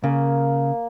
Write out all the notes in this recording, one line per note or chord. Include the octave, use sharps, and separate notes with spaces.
C#3 A#3